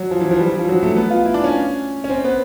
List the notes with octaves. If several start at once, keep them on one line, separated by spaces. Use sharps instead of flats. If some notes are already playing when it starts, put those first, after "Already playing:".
Already playing: F#3
F3
E3
F3
G3
E3
F3
F#3
A3
B3
F4
E4
D4
C#4
C#4
C4
B3